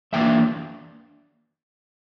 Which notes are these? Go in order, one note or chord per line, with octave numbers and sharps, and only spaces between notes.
F2 E3 A#3 D4 E5 G5